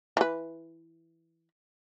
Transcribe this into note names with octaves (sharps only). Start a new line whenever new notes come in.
E3 B4